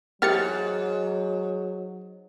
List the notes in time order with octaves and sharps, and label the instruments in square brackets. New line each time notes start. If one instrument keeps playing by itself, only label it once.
[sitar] G#2 [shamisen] E3 G4 A#4 [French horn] F#3 [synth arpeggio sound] F6 A6 C#7